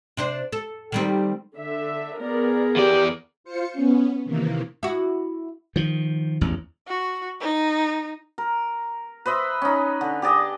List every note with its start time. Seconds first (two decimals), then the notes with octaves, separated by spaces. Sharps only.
0.17 C3 D4 C5
0.52 A4
0.92 D#3 G3 C4
1.55 D3 E5
2.21 B3 G#4 A#4 D5
2.76 E2 G4 D5
3.44 F4 C5 C#7
3.73 B3 C#4
4.25 C3 D#3 E3 A#3
4.83 E4 F#4
5.76 D#3 F3
6.41 A1 E2
6.88 F#4
7.41 D#4
8.38 A#4
9.26 B4 C5 D#5 E5
9.62 C#4 D#4
10.01 D3
10.22 G4 G#4 D5 D#5